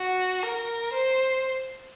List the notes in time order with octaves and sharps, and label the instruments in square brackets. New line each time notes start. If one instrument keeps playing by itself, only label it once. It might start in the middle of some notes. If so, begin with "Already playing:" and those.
Already playing: [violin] F#4
A#4
C5